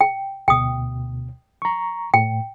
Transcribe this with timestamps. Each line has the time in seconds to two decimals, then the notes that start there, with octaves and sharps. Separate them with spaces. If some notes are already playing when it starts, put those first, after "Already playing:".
0.01 G5
0.48 D2 B2 G5 D#6
1.62 A#5 C#6
2.14 A2 G5